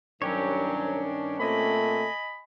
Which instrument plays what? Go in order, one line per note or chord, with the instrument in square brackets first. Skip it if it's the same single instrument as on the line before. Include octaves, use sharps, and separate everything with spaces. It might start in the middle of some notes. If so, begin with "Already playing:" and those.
[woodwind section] C2 F#3 [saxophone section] G2 D#3 D4 [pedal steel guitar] C#4 G4 C#5
[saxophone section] A#2 C4 [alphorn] A3 [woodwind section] D#5 G#5 B5